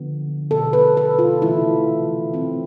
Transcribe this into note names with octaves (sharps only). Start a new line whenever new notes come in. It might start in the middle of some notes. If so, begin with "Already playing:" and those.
Already playing: D3 F3 B3
B2 B3 A4
B4
A4
F4
C3 E3 A3 C4 E4
E3 A3 C4